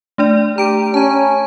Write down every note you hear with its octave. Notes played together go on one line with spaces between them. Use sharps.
A3 D4 D5
G4 A#5 D7
C#4 A5 A#5